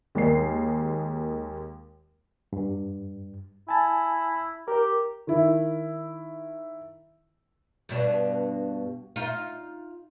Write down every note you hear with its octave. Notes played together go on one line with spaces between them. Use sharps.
D#2 G#3 A#4 C7
G2
E4 G#5 A5
G4 A#4
D#3 E4
G2 B2 D4
D#4 F4